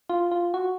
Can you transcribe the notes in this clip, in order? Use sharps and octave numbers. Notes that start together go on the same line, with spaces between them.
F4
F4
F#4